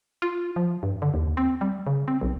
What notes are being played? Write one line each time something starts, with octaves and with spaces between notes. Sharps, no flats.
F4
F3
G2
D3
D#2
C4
G3
C#3
C4
B1